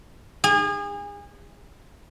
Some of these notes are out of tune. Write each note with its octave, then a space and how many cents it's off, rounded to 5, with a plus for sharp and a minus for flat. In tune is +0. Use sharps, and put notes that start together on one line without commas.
G#4 -35